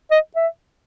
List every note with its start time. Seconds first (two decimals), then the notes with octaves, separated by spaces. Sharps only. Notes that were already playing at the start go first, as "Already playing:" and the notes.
0.11 D#5
0.36 E5